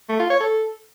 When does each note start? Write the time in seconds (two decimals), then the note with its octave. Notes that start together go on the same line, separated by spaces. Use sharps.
0.09 A3
0.19 F4
0.30 C#5
0.40 A4